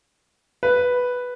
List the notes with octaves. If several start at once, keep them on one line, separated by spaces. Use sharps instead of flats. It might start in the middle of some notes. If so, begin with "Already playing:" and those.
B4